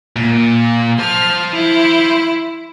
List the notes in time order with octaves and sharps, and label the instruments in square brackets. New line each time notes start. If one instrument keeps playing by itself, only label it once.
[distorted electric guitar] A#2
[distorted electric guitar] C5 A5 [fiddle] F6
[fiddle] E4